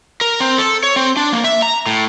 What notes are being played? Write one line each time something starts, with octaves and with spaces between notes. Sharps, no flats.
A#4
C4
A4
C#5
C4
D4
A#3
E5
A#5
A2